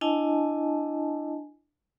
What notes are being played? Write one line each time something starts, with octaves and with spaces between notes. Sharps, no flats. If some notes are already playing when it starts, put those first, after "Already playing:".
D4 E4 D#5 G#5 A5